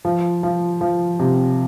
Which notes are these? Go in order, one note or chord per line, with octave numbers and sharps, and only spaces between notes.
F3
F3
F3
C3